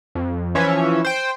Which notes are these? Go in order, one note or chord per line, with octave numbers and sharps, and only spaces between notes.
F2
E3 F3 C#4 C#5 E5
C5 G5